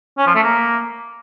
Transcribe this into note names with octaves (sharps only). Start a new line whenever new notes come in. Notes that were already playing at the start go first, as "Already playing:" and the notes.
C#4
F3
A3
A#3